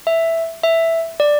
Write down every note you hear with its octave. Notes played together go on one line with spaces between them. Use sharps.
E5
E5
D5